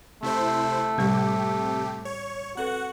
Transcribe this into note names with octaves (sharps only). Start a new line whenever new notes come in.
C3 A3 E4 C5
A2 C3 G3 G4 C#6
C#5
C4 F#4 A4 B4 F#5